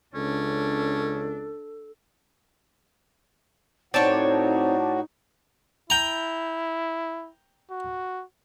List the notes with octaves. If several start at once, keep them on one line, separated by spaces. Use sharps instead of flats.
C#2 C#4 D4 A4
A2 C4 D#4 F#4 C#5 D5 A5
E4 G5 A#5
F#4